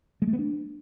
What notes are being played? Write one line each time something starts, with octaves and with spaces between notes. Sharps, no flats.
G#3
A3
B3
D4